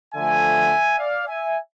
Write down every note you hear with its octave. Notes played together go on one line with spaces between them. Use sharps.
D3 F3 A3 E5 G#5
D5 F5
E5 G#5